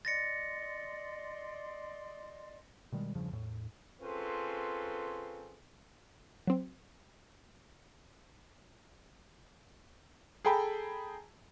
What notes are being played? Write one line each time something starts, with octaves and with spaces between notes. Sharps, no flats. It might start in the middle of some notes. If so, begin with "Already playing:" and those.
D5 D#5 C6 A6 A#6 C#7
B2 D#3 G3 G#3
E2 G2 C#3 F3
E2 A2
C4 C#4 F4 G#4 A4 B4
F#3 C4
G#4 A4 G5 A#5 B5